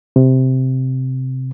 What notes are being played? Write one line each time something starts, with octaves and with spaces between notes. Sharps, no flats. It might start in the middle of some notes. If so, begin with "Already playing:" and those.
C3